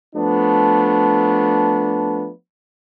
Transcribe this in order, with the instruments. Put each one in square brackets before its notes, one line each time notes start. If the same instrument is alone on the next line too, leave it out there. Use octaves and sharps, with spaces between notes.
[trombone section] F3 A3 B3 D4